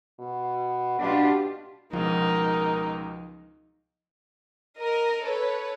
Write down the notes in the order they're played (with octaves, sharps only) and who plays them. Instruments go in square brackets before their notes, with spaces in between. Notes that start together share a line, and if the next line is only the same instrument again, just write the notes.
[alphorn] B2
[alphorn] B2 [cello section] D4 F4 G4
[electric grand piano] C#2 G#2 B2 [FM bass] F3 [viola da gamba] D#4 [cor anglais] A#4
[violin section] A#4 D#5
A4 B4 C#5